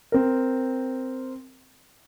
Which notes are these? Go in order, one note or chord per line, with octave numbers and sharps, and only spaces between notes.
C4 A#4